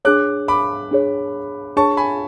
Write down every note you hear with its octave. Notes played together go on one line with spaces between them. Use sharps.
D4 G#4 C#5 D6 F#6
B5 D6
D4 G#4 C#5
D4 G#4 C#5 A5 C#6
G#5 B5